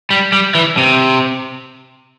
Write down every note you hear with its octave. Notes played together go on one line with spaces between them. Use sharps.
G3
G3
E3
C3